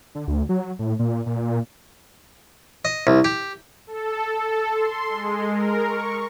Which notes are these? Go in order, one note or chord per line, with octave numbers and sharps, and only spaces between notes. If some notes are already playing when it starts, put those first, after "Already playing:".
D3
D2
F#3
A2
A#2
A#2
A#2
D#5
C2
G4
A4
A4
C6
G#3
A#4
C#6